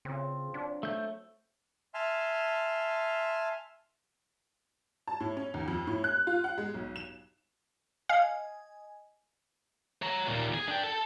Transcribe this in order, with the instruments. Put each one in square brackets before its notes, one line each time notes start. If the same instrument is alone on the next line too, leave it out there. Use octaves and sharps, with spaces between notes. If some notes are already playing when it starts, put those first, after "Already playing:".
[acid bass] C#3 [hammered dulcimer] C4 F4
[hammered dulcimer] F#3 [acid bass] D4
[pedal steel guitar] A3 G6
[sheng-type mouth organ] E5 G#5 A5 C6 F6
[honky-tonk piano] A5
A2
C#4
D#2
F2
A2
F#6
F4
F#5
G#3
B1
E7
[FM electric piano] D#5 G#5 [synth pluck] F5
[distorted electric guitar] C#5 A#5
D#2 A#2
G#4
D4 G5
A4